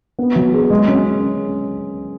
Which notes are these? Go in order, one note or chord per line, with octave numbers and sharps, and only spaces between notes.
B3
F#3
G#4
G#3
C#4